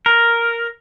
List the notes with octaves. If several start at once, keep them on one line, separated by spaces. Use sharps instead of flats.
A#4